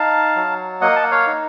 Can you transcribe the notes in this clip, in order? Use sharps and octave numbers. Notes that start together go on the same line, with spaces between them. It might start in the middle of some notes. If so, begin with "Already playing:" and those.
Already playing: D#4 F5 A5
F#3
A#3 D#5 F#5
A5
F#5
C#5 F5
D#4